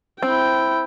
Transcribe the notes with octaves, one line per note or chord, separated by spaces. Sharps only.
C4 E4 G5